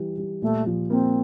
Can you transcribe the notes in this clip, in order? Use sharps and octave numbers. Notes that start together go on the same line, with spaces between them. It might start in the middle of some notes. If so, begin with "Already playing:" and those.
Already playing: E3 G3
G3
A#2 A3
F3
A#3 C4